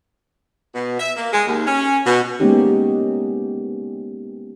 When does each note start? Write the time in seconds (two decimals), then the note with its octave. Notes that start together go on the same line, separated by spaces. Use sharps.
0.75 B2
0.98 E5
1.16 A#3
1.31 G#3
1.47 D#2
1.66 C#4
2.05 B2
2.40 G#3 A#3 B3 C#4 D#4 G4